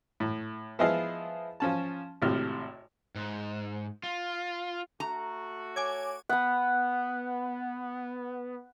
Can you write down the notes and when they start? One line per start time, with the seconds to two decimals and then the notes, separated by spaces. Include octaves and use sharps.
0.20 A2
0.79 F3 B3 E4 G#4 D#5 F5
1.60 F3 C#4 A5
2.22 G#1 A2 C3 F6
3.16 G#2
4.03 F4
5.00 A3 F#4 A#5
5.76 C#5 G#5 D6 G#6
6.29 B3 F#5 B5